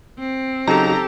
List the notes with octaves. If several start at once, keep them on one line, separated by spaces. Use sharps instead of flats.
C4
C#3 F#3 D#4 G4 A4 A#5